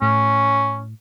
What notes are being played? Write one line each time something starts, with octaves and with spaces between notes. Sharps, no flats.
A2 C#4